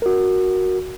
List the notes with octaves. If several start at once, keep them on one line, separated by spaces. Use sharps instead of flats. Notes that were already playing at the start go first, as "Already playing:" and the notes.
F#4 A#4